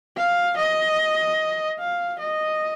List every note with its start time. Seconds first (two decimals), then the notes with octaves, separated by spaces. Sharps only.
0.17 F5
0.57 D#5
1.79 F5
2.19 D#5